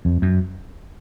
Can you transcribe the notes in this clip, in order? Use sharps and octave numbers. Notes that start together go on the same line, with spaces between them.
F2
F#2